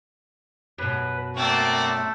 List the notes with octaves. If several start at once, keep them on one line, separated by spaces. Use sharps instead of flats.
F#2 B2 B4
A3 A#3 C4 D5 F#5